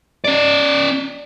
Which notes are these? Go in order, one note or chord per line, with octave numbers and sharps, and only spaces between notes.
C#4 D5